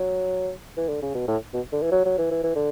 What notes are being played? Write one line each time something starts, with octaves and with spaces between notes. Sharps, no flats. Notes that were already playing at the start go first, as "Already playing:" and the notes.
Already playing: F#3
E3
D3
C#3
B2
A2
B2
D3
E3
F#3
F#3
E3
E3
E3
D3